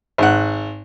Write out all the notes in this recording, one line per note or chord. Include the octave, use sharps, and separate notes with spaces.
G#1 F#5